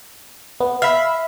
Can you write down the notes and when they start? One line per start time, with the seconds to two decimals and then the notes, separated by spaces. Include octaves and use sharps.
0.60 B3
0.82 E5 F5 B5